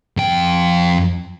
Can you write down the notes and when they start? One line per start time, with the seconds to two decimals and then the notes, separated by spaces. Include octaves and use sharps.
0.17 F2 G5